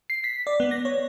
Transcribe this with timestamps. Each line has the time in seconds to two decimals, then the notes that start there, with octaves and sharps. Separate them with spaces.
0.10 C7
0.24 B6
0.47 D5
0.60 B3
0.71 A#6
0.85 C#5